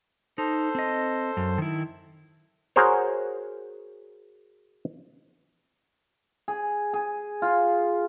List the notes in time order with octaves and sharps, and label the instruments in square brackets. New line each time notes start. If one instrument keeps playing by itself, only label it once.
[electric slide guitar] D#4 [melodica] A4 C5
[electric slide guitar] C4 D#5
F#2
D#3 E4
[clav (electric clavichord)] F#4 G#4 A#4 C5 C#5
[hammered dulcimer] G#4
G#4
F4